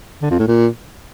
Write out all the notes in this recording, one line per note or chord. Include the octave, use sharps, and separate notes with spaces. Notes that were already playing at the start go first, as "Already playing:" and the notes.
D3
F2
A2
A#2